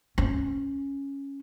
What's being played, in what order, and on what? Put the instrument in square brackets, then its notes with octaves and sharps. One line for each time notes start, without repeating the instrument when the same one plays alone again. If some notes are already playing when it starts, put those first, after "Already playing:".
[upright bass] C#4